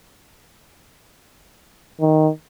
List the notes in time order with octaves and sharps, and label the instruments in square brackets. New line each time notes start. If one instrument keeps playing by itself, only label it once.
[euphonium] D#3